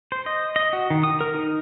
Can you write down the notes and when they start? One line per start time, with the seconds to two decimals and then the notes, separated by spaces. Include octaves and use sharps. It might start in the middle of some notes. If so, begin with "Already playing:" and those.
0.12 C5
0.26 D#5
0.56 D#5
0.73 F#4
0.90 D#3
1.03 D#6
1.21 A#4
1.34 D#4